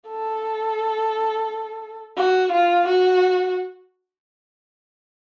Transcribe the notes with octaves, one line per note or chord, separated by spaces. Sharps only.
A4
F#4
F4
F#4